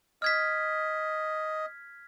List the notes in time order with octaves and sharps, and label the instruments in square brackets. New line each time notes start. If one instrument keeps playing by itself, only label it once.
[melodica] D#5 [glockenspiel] F6 G#6 B6